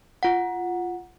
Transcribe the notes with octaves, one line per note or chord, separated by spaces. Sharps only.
F4 F#5